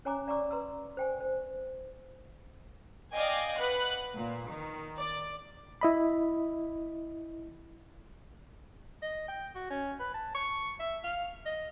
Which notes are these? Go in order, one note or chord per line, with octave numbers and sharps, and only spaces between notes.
C#4 C#5 G#5 A#5 D6
D5 F5 A#5 C#6 D6 E6
B4 A#5 C6 E6
C5 G5 G#5
C5
D5 D#5 F5 G5 G#5
B4 F#5 F#6
A#2
D#3
D5
E4 D#5 B5
D#5
G5
F#4
C#4
B4
A5
C#6
E5
F5
D#5